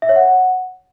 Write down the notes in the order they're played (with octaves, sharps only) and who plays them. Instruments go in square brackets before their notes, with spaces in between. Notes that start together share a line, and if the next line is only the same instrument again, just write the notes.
[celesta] E5
C#5
F#5